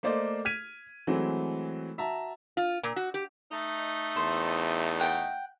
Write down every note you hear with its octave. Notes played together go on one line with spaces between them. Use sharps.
A3 A#3 C5 D5 D#5
F6 G#6 B6 D#7
E3 F#3 G#3 A3 C4
F#4 E5 A5 A#5
F4
A#2
F#4
G4
A3 D#4
E2 C5
F#5 G5